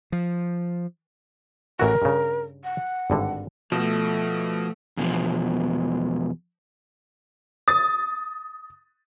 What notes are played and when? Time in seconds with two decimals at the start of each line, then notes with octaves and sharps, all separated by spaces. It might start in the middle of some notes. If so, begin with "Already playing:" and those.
0.12 F3
1.79 A1 E3 F#4 A#4
2.02 G2 C#3
2.64 F#5
3.10 G#1 G2 D3
3.72 B2 F3 A3
4.97 E2 B2 D3 F3
7.68 D#6 A6